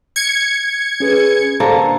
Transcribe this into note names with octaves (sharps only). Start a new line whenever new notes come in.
G#6 C#7
C#4 G#4 B4
D3 A#3 A4 C5